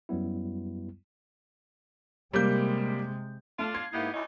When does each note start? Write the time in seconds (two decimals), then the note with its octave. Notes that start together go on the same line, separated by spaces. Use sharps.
0.09 F#2 F#3 G3 B3 E4
2.33 C3 G3 G#3 A#3 G6
3.59 A3 D4 F4
3.74 G#6 C7
3.93 G#2 A#3 B3 D#4 E4 G4
4.14 D2 C#4 D#4 E4